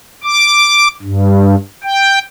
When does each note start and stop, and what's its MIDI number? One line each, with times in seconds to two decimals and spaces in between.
0.23 0.88 86
1.02 1.55 43
1.84 2.19 79